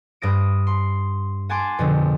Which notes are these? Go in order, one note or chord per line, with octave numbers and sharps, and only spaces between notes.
G2 D#6 A#6 D7
C6
F#5 G#5 A5 C6 D6
F2 B2 D3